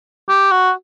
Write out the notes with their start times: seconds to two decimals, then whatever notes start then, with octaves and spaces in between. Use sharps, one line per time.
0.29 G4
0.51 F#4